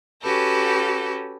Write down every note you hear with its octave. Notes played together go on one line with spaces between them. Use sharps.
C#4 F#4 G4 A4 B4